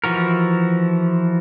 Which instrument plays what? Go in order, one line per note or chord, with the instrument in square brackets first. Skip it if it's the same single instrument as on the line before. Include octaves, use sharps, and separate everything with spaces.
[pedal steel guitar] E3 F3 F#4 A#4